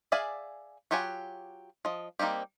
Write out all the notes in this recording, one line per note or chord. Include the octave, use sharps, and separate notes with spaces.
G#4 D5 E5 F5 G#5
F#3 F4 G4 F#5 G#5
F3 D#5
G3 A#3 C4 D#4 G4